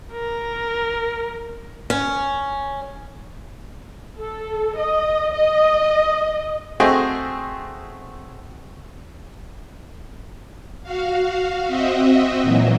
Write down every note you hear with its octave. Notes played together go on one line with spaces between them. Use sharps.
A#4
C#4
A4
D#5
D#5
A3 C4 F#4 G#4 D#5 G5
F#4 F5
C4 F#4 D#5 E5
A#2 E3 F#3